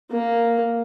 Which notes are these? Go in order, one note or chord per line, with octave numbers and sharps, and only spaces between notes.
A#3